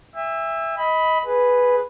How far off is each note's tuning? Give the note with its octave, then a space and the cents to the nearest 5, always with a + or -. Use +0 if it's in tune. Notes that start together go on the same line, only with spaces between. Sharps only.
E5 +5 G#5 -45
D#5 +25 B5 +0
G#4 +0 B4 +0